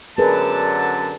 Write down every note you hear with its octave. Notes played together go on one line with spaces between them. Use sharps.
F#2 D3 G#4 A#4 B4 A5